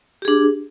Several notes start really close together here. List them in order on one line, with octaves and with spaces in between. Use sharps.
G4 G#4 D4